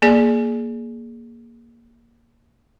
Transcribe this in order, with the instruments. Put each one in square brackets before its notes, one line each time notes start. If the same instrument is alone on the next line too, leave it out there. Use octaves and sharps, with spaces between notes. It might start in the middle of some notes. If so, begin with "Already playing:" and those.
[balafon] A#3 G#4 D5